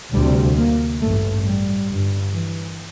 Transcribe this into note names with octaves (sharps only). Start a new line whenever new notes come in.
D2 C3 G3
A#3
A1 G2 A3
G3
G1 G2
E3